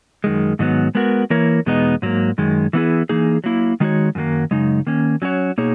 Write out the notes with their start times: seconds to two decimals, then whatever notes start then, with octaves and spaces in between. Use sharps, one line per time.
0.24 F#2 D#3 G#3
0.59 G#2 D#3 F#3 B3
0.95 G#3 B3 F#4 A#4
1.30 E3 A#3 E4 A#4 C#5
1.66 E2 B2 G#3 B3 D#4
2.02 G#2 F#3 A#3
2.38 F#2 D#3 G#3
2.73 E3 B3 E4 G#4
3.09 E3 A#3 D#4 G#4
3.44 F#3 A#3 E4
3.80 D#3 G#3 D#4 F#4 C#5
4.15 F#2 D#3 F#3 A#3
4.51 F#2 C#3 G#3 D#4
4.87 D#3 A#3 C#4
5.22 F#3 C#4 F#4 C#5
5.58 B2 A#3 D#4 G#4 C#5